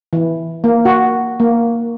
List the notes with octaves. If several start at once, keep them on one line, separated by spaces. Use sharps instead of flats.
E3
A#3
F#4
A#3